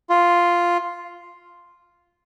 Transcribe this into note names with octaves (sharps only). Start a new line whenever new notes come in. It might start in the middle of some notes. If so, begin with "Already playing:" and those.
F4